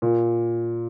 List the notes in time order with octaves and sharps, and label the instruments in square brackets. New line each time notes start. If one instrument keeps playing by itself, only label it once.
[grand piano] A#2